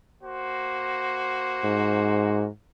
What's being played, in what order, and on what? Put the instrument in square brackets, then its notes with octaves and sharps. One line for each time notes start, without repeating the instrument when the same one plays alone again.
[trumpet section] A#3 F#4 C5
[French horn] G#2